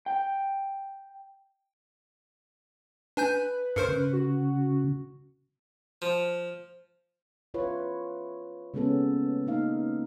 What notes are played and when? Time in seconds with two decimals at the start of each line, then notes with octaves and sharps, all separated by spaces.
0.06 G5
3.17 D4 B4 G#5 G6
3.76 G2 A#4 C5 C6 C#6
3.88 C#3
4.13 F#4
6.02 F3
7.54 E4 F4 B4 C#5
8.74 C#3 G#3 A#3 B3 C#4 A4
9.47 A#3 D#4 F5